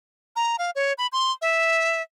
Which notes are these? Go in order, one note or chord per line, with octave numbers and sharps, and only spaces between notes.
A#5
F5
C#5
B5
C6
E5